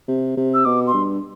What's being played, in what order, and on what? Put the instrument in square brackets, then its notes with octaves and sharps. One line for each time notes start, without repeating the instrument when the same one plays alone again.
[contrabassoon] C3
C3
[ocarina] E6
[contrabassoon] B2 [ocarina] D6
[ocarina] C6
[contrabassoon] G2